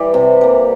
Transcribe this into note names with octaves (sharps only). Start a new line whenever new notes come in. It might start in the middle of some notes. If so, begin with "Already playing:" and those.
Already playing: E3 G3
C3
G3 A#3